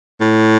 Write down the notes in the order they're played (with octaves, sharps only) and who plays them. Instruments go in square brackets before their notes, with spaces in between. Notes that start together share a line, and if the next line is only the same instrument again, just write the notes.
[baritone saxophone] A2